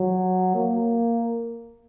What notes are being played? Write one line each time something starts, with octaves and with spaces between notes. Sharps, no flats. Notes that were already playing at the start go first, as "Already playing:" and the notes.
Already playing: F#3
A#3